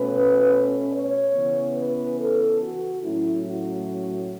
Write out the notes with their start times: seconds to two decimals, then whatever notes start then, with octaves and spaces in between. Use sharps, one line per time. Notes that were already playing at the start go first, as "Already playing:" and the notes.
Already playing: B2 A3 C#4 B4
0.92 C#5
1.33 C#3 E3 B3
1.76 B4
2.18 A4
2.60 F#4
3.02 A2 F#3 A3 C#4 E4
3.44 F#4